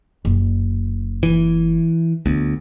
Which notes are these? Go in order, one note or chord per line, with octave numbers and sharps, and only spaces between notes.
F#1
E3
D2 B3